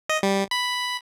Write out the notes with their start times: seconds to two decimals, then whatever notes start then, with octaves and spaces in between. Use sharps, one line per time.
0.09 D#5
0.23 G3
0.51 B5